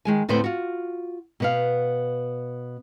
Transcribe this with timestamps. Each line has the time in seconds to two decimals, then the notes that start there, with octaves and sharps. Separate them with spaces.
0.05 D#3 G#3 G#5
0.29 D2 A2 B3 C4 B4 C5
0.44 F4 F#4
1.40 B2 B3 F5